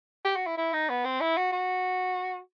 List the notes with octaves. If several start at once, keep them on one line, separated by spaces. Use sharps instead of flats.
G4
F#4
E4
E4
D#4
B3
C4
E4
F#4
F#4